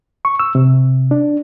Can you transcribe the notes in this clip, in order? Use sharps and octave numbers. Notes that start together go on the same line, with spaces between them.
C#6
E6
C3
D4